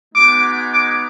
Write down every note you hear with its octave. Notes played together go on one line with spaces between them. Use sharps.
G#3 B3 D#4 F#4 D6
D6